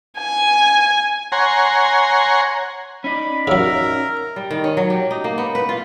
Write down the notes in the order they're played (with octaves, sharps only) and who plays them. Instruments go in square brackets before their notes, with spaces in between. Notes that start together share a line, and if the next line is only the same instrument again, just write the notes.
[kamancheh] G#5
[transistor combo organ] C#5 F#5 G#5 A#5 C6
[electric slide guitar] C#4 D#4 D5 [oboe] B5
[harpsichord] C#3 F#3 [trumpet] A#4 [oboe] E5
[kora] G3
D#3
C#4
F#3
G4
D#4
A#3
B3
B4
F4